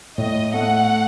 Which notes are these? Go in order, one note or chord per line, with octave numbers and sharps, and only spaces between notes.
A2 D#5
A3 F#5